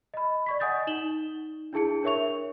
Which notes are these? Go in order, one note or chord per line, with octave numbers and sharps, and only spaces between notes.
D#5 B5
D5 C#6 B6
D#5 F#5 G#5 D#6 G6 A6
D#4 E7 F#7 G7
D4 E4 G#4 A5 C#7
D4 A#4 C#5 E5 C#6 F7